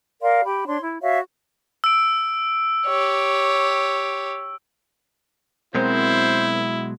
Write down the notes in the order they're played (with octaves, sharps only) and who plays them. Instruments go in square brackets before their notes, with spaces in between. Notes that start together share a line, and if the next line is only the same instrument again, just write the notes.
[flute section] A#4 D5 F5 C6
G4 B5
D4 C#5 C6
E4
F#4 C#5 E5 F5
[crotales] E6 D7
[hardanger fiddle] G4 C#5
[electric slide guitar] B2 F#3 G#3 [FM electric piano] C4 A#4 [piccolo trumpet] E4 [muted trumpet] C5